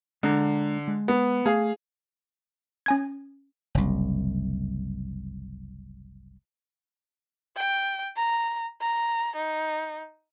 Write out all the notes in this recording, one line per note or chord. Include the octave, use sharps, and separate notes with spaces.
D3 G#3 D4 A#5
G#3
B3
A3 G#4 F5
C#4 G#5 G#6
F#1 C2
G5
A#5
A#5
D#4